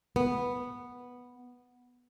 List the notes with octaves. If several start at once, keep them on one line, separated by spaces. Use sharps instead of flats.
B3